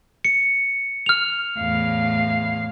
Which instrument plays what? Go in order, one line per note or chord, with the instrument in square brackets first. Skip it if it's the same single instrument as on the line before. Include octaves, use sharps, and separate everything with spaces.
[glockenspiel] C#7
F6 F7
[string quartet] E2 A2 F5